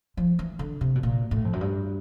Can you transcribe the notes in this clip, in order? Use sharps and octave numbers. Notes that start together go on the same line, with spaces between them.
F3
E3
D3
C3
B2
A#2
A2
F2
F#2
G2